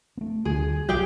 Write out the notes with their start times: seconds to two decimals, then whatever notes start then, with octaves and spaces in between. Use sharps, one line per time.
0.17 A3 B3
0.45 D2 D3 G3 G#4
0.89 D#1 B1 G4 G#4 G5